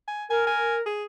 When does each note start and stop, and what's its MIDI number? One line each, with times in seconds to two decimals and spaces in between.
0.08 0.25 80
0.30 0.81 70
0.30 0.45 80
0.46 0.76 80
0.86 1.04 68